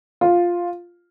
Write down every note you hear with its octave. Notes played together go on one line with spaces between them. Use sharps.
F4